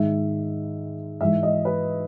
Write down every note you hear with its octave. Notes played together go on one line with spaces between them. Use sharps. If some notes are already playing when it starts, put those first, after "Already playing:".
Already playing: G#2 D#3 G#3 E5
G#2 E3 G#3 E5
D#5
B4